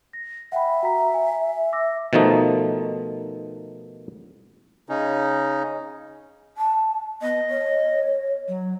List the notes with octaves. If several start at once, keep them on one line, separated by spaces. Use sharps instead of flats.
A#6
E5 F#5 G5 B5
F#4 A#5 B6
G#5
D6 E6 A#6
B2 D#3 F3 A3 D#4
C#3 C#4 D#4
A5
B3 D#5
C#5
F#3